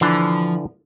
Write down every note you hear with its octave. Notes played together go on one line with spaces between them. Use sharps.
D3 E3 F3 D4